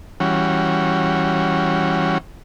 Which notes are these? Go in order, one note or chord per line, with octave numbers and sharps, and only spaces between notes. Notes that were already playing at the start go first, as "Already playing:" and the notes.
E3 G3 C#4 F#4